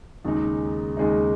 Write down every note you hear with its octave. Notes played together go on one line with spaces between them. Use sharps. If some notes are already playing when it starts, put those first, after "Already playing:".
D#2 C#3 G#3 D#4
D#2 C#3 G#3 D#4